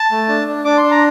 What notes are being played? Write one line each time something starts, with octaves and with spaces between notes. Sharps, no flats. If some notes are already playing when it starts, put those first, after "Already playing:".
Already playing: A5
A3
D4
D4
D4 D6
C6
D4
A#5